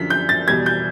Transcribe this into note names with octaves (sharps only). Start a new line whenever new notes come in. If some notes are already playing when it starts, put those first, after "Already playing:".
Already playing: F#2 D3 F3 B6
G6
A6
E2 B2 G3 G#6
G6